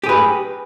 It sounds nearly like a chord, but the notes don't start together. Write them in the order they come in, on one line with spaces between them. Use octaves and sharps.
G4 G#4 B4